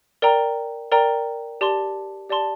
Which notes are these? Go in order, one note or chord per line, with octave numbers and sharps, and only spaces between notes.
A#4 D5 G5 A#5
A#4 D5 G5 A#5
G4 D5 A5 C6
G4 D5 A5 C6